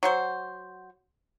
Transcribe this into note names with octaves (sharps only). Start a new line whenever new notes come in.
F#3 F#4 C5